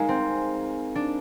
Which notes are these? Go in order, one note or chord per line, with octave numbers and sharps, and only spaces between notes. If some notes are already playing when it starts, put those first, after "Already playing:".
Already playing: G#3 D#4 A#4 F5 G#5
C4
D4